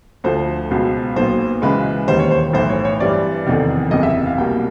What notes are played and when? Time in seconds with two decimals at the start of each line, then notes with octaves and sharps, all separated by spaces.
0.24 D2 D3 F3 C5
0.71 C#2 B2 F#3 B3
1.16 B1 A#2 F#3 B3 C5
1.62 C#2 C#3 E3 G#3 B4
2.08 E1 D#2 D#3 G3 C5
2.19 C#5
2.31 C5
2.53 B1 A2 E3 C5
2.69 C#5
2.85 C#5
2.99 G2 E3 G3 C4 D5
3.46 F1 E2 C3 D#3
3.91 F#1 E2 C3 D#5
4.03 E5
4.26 F5
4.38 C2 B2 G3 A#3 G5